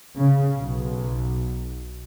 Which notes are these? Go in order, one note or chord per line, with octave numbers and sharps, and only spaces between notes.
C#3
B1